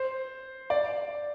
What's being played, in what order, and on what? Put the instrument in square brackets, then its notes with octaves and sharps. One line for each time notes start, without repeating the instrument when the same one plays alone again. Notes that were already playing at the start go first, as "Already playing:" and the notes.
Already playing: [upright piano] C5
D5